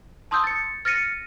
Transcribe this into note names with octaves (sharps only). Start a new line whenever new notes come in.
A5 C6 D#6 E6 G6
A6 C#7
F6 A6 A#6 C#7 D#7